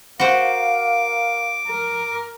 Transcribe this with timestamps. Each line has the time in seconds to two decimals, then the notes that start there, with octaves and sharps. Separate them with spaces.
0.20 F#4 A#4 C5 F5 D6
1.67 A#4